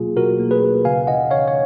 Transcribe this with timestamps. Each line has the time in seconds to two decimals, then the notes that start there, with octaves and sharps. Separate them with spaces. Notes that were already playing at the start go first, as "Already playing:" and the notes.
Already playing: B2 F#3 A#3 F4 G#4
0.16 B2 F#4 A#4
0.40 A#3
0.51 G#4 B4
0.62 B2
0.85 C#3 F5 G#5
1.07 C#3 D#5 F#5
1.30 C#3 C#5 F5
1.48 C#5